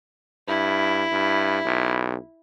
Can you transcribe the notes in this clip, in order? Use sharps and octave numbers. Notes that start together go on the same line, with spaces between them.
G2 E4
G2
B1